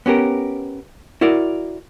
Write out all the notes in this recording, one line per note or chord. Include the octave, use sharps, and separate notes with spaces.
B3 C#4 G4 A#4
E4 F#4 A#4 D5